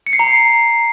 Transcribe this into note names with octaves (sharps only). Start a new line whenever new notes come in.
C#7
C7
A#5